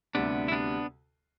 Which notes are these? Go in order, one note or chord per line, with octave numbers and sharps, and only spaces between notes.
D2 C3 G3 B3 D4
E4
B3 D4